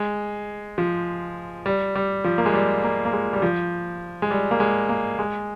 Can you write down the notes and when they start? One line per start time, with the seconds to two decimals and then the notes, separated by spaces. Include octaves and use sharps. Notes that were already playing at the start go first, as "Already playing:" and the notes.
Already playing: G#3
0.78 F3
1.66 G3
1.95 G3
2.24 F3
2.38 A#3
2.46 G#3
2.54 G3
2.84 A#3
3.05 A#3
3.13 G#3
3.33 G3
3.42 F3
4.22 G#3
4.31 G3
4.51 A#3
4.60 G#3
4.89 A#3
5.19 G#3